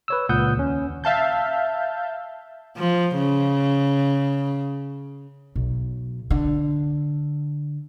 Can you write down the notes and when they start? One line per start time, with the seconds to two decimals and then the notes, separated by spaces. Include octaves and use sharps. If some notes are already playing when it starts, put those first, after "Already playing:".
0.08 B4 C#5 E6
0.29 C#2 A#2 F#5 D#6 G6
0.57 D#2 C#4
1.04 E5 F5 A5 G6
2.77 F3
3.18 C#3
5.56 B1
6.30 D3